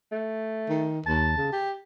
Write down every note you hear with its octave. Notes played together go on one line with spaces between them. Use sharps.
A3
D#3
D#2 A5
C#3
G4